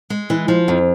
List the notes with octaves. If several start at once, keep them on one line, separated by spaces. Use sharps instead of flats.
G#3
E3
F3
F2